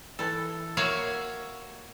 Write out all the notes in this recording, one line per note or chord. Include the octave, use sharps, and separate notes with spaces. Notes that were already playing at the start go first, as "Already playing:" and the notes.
E3 A4
A#3 F#4 C#5 E5 F5